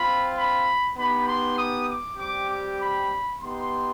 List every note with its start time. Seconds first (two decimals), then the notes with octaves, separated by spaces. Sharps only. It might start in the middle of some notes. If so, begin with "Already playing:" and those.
Already playing: C4 F4 B5
0.34 B5
0.95 B3 D#4 G4 B5
1.25 C6
1.56 D#6
1.86 D6
2.17 G3 C4 G4 D6
2.48 D6
2.79 B5
3.39 B3 D#4 G4 C6